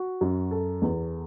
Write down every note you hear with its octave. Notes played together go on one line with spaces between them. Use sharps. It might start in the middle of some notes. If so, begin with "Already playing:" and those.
Already playing: F#4
F#2
A4
E2